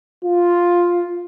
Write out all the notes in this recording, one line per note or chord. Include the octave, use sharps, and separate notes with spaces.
F4